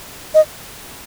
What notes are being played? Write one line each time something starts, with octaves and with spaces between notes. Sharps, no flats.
D#5